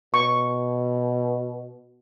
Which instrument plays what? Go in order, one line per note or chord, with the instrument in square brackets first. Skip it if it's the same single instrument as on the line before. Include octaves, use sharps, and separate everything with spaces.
[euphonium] B2 [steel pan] C#6